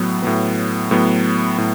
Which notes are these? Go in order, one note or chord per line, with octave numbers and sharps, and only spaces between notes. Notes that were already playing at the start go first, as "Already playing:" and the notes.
Already playing: A2 F#3 B3
A2 F#3 B3
A2 F#3 B3
A2